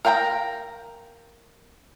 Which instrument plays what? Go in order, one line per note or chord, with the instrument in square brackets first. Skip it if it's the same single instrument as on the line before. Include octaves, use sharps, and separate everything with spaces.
[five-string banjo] A#4 F5 G5 A5 A#5